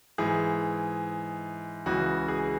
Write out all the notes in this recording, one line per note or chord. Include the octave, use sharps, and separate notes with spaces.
G#2 E3 G#4
C#2 C#3 E3 F#4
G#4